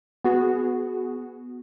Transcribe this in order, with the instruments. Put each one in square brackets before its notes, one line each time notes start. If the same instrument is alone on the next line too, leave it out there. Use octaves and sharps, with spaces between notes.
[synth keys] B3 F#4 G#4